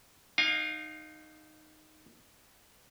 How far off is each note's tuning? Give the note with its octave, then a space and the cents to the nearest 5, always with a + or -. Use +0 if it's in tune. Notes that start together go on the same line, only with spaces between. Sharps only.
D#4 -10 F5 +15 G#5 -35